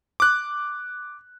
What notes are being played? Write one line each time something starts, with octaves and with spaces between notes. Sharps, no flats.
D6 F#6